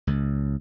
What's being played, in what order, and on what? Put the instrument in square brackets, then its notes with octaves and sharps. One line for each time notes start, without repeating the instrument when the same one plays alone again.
[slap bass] C#2